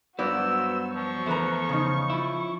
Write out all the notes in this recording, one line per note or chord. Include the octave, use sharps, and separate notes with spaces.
G2 F#3 B3 F#4 C5 D5 E6
F3 C#6
E2 A3 B4 C5 A#5
C#3 D#4
F3 E4